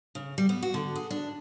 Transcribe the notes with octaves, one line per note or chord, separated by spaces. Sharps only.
C#3
G3
B3
F#4
D3
G#4
D4